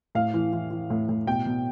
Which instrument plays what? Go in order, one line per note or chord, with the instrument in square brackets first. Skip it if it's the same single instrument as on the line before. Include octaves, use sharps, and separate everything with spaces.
[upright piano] A2 F5
E3
E3
E3
A2
A2
B2 G5
B2